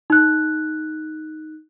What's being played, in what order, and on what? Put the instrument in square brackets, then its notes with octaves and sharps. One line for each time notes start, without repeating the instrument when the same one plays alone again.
[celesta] D#4 F#6